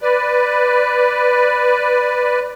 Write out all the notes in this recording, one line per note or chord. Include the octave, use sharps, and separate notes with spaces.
B4 D5